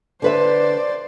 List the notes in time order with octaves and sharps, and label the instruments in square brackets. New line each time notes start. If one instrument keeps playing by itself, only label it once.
[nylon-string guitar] D3 B4 E5 [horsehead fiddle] C5 D5